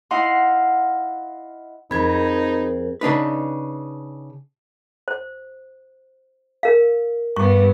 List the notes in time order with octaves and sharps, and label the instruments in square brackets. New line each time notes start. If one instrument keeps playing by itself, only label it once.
[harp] E4 D#5 F5 F#5 C6
[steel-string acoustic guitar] F2 C4 [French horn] D#4 [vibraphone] G#4 A#4 [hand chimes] B5 G#6
[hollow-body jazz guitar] C#3 D4 D#4 B4
[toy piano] C5
A#4 F5
[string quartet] G2 B3 [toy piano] C#6